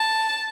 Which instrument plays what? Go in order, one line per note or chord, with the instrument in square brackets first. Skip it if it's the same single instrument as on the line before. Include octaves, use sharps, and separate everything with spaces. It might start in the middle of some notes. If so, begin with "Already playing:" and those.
Already playing: [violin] A5